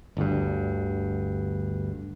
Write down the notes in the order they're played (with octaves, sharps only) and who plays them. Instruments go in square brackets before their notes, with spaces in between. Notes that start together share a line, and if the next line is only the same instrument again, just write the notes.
[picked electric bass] G1 D2 G2